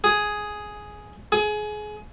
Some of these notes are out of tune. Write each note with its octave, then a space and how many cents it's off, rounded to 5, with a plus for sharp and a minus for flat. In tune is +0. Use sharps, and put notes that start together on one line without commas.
G#4 +5
G#4 +25